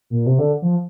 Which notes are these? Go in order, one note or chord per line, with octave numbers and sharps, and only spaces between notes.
A#2
C3
D3
F3